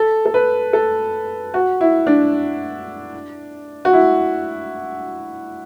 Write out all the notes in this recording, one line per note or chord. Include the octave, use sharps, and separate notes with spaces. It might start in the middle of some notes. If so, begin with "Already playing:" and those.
Already playing: A4
A4
B4
A4
F#4
E4
D4
F#4
E4